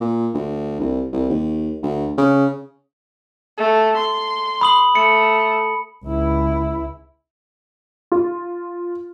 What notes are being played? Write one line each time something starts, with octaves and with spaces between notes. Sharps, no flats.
A#2
D2
C2
C2
D#2
D2
C#3
A3
C6
B5 D#6 F#7
A3 C#7
C#2 E4
F4